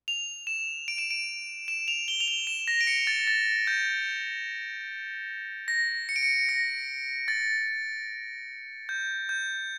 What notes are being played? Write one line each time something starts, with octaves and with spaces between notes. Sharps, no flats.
F7
E7
D7
E7
D7
E7
F7
G7
F7
G7
E7
A#6
D7
C#7
A6
A6
G6
A#6
C#7
D7
C#7
A#6
A6
G6
G6